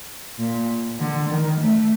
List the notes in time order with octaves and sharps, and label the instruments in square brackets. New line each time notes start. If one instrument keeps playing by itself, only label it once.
[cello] A#2
D3
D#3
A3